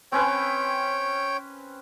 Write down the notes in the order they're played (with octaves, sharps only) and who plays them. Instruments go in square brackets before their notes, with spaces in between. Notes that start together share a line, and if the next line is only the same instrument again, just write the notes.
[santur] C4 C#4 B4 [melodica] C#5 G5